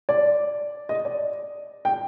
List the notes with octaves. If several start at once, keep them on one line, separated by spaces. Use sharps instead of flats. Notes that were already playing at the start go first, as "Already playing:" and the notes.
D5
D#5
D5
G5